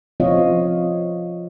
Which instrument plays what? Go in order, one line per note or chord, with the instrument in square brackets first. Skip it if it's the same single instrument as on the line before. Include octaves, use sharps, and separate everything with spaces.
[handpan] F3 C4 F4 C#5 D#5 F5